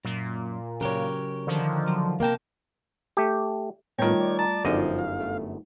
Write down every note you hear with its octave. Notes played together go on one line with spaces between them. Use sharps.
F#2 A#2
C#3 F#3 G4 A#4 C#5
D3 D#3 F3
F#3
C3 A#3 A#4 G5 A5
A3 G4
A2 D#3 G3 A3 B3 F4 C#5 G5
D5
A5 A#5
G1 F#2 F3 D#4 D#5
F5
A3